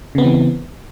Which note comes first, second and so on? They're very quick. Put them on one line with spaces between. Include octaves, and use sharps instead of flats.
C#3 B3 C4 E3